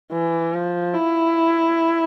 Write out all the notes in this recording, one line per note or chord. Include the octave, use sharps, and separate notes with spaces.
E3
F3
E4